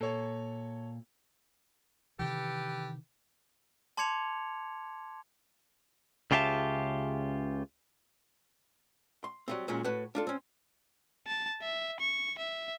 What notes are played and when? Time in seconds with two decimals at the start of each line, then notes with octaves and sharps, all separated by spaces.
0.01 A#2 A4 C#5
2.19 C3 D#3 E3 G4 A4 B4
3.97 A5 C6 D6 G#6 C#7 F7
6.31 C#2 C#3 F4 G4 E5 A5
9.24 C6
9.48 F#3 G3 C4
9.68 D#2 A#2 F#3 G#3 C#4
9.84 A2 F#4 B4 A5
10.15 D4 F4 A4
10.27 C4 C#4
11.27 A5
11.61 E5
11.99 C#6
12.38 E5